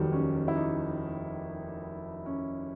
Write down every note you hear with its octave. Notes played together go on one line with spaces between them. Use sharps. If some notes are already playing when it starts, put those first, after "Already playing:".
Already playing: F1 D#2 D#3 F#3 G3
C#4
E4
D#4
C#4